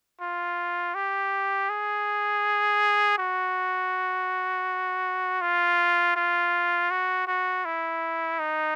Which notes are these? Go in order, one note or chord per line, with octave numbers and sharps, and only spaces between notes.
F4
G4
G#4
F#4
F4
F4
F#4
F#4
E4
D#4